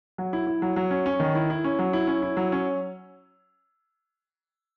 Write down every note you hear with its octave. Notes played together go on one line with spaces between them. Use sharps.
F#3
E4
E4
F#3
F#3
C#4
C#4
D#3
E4
E4
C#4
F#3
E4
C#4
E4
F#3
C#4